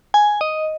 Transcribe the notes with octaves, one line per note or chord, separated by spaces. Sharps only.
G#5
D#5